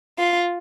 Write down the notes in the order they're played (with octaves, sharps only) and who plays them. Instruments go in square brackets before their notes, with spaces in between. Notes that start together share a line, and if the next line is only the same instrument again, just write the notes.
[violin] F4